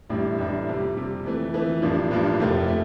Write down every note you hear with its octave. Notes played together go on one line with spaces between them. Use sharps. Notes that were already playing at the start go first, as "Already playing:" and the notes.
A1 A2 G3 D4
A1 A2 G3 D4
F2 C3 G3
F2 C3 G3
F2 E3 A3
F2 E3 A3
A1 G2 F3 A#3 D4
A1 G2 F3 A#3 D4
F1 F2 C3 F3 A3
A3